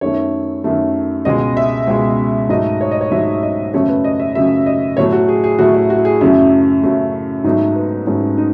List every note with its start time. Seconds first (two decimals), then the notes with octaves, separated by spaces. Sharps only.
0.01 F#2 D#3 A3 C#5
0.64 F#2 D#3 A3
1.25 C#2 B2 G#3 D#5
1.57 E5
1.87 C#2 B2 G#3
2.49 G#2 F#3 A3 D#5
2.81 C#5
2.91 D#5
3.01 C#5
3.11 G#2 F#3 A3 E5
3.43 D#5
3.74 F#2 C#3 F#3 A3 C#5
3.89 B4
4.04 D#5
4.20 E5
4.35 F#2 C#3 F#3 A3 E5
4.66 D#5
4.97 A2 F#3 A3 C#5
5.12 F#4
5.28 G#4
5.44 G#4
5.59 A2 F#3 A3 F#4
5.74 E4
5.90 F#4
6.05 G#4
6.21 F#2 C#3 F#3 A3 E4
6.83 F#2 C#3 F#3 A3
7.44 G#2 F#3 A3 D#4
7.75 B3
8.07 G#2 F#3 A3 C#4
8.38 D#4